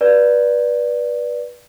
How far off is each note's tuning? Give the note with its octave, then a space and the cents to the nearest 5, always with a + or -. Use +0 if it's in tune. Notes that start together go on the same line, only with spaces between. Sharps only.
B4 -20 D5 +0